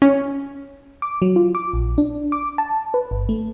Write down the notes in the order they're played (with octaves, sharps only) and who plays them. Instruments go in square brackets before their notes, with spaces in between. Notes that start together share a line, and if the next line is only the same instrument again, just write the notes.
[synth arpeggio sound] C#4
[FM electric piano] D6
F#3
F4
D6
A#1
D4
D6
A5
B4
G1
A3